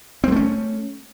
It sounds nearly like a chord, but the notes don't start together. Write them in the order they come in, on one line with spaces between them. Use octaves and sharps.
C4 G#3 A3 C#4